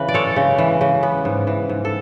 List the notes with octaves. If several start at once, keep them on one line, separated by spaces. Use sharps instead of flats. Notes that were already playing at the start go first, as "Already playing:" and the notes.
Already playing: C#3 E3 B4
D5
G#3 A4 C#5
C#3
E3
C#3
B3
G#2
E3
G#2
A4